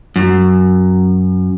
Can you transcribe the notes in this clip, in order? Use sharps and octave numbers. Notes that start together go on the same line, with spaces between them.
F#2